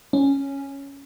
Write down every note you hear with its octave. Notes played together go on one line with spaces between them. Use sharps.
C#4